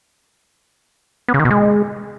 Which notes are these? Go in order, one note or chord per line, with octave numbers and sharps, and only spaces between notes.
B3
C#3
D#3
B2
G#3